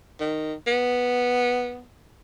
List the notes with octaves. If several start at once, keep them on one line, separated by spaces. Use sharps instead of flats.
D#3
B3